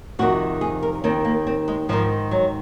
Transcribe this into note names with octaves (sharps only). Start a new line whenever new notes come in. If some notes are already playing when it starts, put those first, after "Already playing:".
F2 C3 D#3 F#4
G#4
A#4
D#2 D#3 C4
A#3
C4
G#3
G#2 D#3 F3
F#3